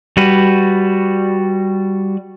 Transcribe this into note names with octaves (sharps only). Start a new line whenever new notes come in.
G3 F#4 B4